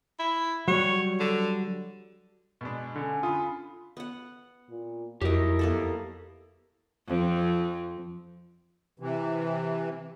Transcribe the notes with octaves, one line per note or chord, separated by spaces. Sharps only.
E4
F#3 G3 C#5
D3
B2 G#3 D4
D3 C#4
D3 F4 B5 D#6
B3 F#5
A#2
F2 F#3 E4 G4 A#4 D#5
A#3 B3 A4
F2 C4
C3 E3